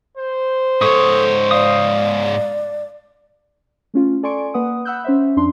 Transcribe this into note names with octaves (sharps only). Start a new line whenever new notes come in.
C5
G#2 A4 C#5 C#6 D#6
D5 F5 D#6
A3 C#4 F4
A4 D5 G#5 C6 C#6 D7
A#3 B4 F#5 D#6
F#5 B5 E6 F#6 G6
C#4 C5 E5
F2 D4 C6